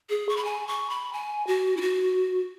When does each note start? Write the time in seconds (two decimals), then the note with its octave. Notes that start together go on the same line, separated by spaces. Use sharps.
0.10 G#4
0.29 C#6
0.36 B5
0.45 G#5
0.67 C#6
0.90 B5
1.13 G#5
1.47 F#4
1.77 E4
1.81 F#4